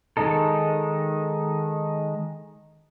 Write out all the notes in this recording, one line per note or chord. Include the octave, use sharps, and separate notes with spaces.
D#3 G#3 D#4 A4